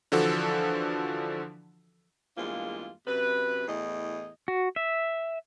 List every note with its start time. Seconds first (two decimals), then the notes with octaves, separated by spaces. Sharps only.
0.12 D3 E3 F3 F#4 A4
2.36 E2 G2 G#3 A#3 F4
3.07 F#2 C3 B4
3.68 E2 A2 D#5
4.48 F#4
4.76 E5